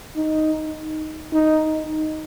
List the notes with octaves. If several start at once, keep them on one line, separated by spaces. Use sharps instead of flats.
D#4
D#4